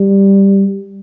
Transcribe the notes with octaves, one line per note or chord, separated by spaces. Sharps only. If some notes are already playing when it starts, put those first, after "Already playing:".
Already playing: G3